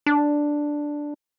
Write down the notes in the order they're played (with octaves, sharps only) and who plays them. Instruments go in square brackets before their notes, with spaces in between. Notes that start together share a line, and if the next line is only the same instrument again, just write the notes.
[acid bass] D4